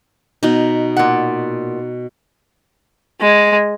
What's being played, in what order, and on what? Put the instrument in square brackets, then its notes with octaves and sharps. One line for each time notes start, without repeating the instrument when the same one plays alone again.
[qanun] B2 D#4
[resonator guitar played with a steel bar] A#2 F#5
[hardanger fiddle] G#3